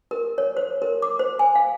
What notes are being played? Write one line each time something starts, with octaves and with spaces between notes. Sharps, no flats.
A#4
C#5
C5
A#4
D6
C5
G#5
F5